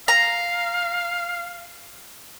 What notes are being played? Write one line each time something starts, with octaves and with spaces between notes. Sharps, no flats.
F5 A#5